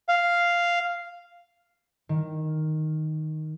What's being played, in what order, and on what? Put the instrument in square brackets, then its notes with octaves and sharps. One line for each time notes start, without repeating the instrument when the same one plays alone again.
[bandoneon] F5
[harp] D#3